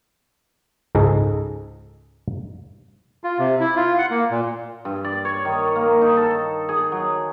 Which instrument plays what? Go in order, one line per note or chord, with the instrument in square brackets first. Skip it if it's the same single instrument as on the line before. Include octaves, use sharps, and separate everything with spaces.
[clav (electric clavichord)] C#2 G#2 G#4 A4 D#5 A#5
[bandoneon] F4
C3
E4
F4
F#5
A#3
A#2
[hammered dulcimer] G2
D5
C#5
D#3
A#3
D#4
A4
G#4
F#3